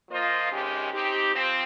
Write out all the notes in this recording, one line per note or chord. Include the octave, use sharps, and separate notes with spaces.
F3 A#3 F4 C5 D#5
C3 D#3 G#3 C#4 G4
C4 D#4 G4
F3 C4